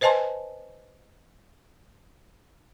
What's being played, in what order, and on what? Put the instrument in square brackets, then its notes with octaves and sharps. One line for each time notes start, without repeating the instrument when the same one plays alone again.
[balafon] B4 C5 D#5 G#5 A5 C6